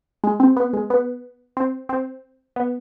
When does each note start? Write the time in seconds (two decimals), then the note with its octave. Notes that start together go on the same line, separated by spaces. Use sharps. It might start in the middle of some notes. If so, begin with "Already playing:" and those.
0.24 G#3
0.40 C4
0.56 B3
0.73 G#3
0.90 B3
1.57 C4
1.89 C4
2.56 B3